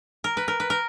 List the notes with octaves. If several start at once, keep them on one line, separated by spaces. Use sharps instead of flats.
A#4
B4
A#4
B4
A#4